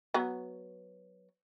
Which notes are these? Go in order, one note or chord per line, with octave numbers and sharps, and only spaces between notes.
F#3 B3